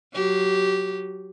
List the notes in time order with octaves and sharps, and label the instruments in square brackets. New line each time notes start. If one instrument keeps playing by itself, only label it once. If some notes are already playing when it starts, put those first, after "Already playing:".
[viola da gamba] F#3 G4